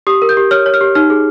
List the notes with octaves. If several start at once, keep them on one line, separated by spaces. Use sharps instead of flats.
G4 D#6
A#4
G6
G4
C#5 F6
C#5
F6
G4
D#4 F6
G#4